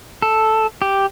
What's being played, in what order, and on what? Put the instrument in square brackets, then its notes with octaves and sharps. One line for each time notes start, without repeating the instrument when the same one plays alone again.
[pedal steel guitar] A4
G4